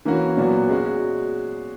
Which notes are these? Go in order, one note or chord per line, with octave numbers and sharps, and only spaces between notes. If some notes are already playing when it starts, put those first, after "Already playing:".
E3 A#3 C#4 F#4
A#2 F#3 B3 F#4
G#3 C#4 F#4